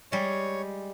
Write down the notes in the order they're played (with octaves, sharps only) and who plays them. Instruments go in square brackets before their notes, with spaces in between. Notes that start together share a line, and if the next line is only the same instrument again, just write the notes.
[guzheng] G3 G#3 [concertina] C#5